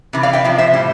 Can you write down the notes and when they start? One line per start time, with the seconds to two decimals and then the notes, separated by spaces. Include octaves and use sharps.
0.13 C3 E3
0.23 D5 F5
0.33 E5 G5
0.45 C3 F3
0.58 C5 E5
0.74 A2 G3